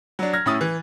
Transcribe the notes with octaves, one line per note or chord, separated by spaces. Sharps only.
F#3 D4
F6 G#6 A#6
A2 C#4 E4 D#6 A6
E3